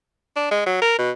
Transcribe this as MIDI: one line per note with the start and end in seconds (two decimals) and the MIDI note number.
0.36 0.49 62
0.51 0.63 56
0.66 0.78 54
0.82 0.95 70
0.98 1.11 47